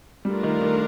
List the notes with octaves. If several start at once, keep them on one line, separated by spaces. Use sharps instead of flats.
G3 A3 D4 F4 A#4
D#3
D#3